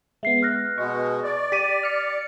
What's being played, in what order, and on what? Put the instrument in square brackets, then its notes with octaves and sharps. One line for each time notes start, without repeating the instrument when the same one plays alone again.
[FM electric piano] G#3 B3 [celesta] E5 C7
[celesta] F6 F#6 A#6
[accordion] B2 G#3 [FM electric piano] C#6
[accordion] D5
[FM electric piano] G4 [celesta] B6 D7 D#7
[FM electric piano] F6 C#7